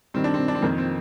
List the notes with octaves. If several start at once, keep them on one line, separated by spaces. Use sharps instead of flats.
G2 D#3 C4
D4
C4
D4
C4
F2 D#3 A#3
C4